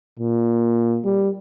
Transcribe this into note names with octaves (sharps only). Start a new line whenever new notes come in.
A#2
G3